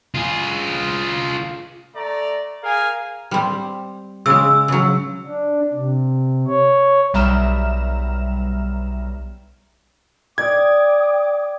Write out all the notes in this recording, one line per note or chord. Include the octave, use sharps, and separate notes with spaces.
F4 G#4
A3 D5 A#5
G#4 A#4 F5 G#5
G3 C4
C#3 G#3 E6
C#3 F#3
D4
C3
C#5
B1 G3 E5 A#5 F6 E7
D5 G5 D6 D#6 G#6